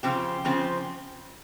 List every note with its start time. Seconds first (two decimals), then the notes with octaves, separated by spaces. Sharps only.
0.03 C#3 F3 C4 G4
0.45 C#3 F3 C4